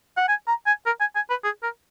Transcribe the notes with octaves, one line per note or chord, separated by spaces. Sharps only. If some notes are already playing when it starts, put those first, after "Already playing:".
F#5
G#5
A#5
G#5
A#4
G#5
G#5
B4
G#4
A#4